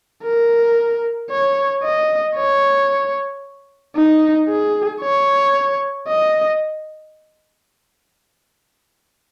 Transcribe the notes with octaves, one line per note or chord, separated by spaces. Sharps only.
A#4
C#5
D#5
C#5
D#4
G#4
C#5
D#5